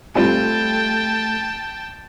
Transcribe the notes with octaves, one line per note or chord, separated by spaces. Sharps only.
G3 A3 C4 F4 G5 A5